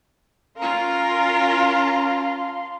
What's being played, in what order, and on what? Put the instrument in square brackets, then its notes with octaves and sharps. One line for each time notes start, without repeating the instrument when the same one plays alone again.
[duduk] C#4 [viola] F4 A#4 [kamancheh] F5 C6 [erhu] A#5